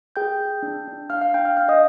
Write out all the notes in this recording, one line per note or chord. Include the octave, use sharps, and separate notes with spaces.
G#4 G5 G6
G#4
D4
D4
D4 F5 F6
F5 F6
D4 G5 G6
F5 F6
D4 F5 F6
D#5 D#6